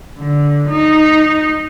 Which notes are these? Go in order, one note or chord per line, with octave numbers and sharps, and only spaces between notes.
D3
D#4